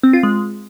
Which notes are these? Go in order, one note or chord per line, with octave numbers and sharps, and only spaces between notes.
C4
F4
G#3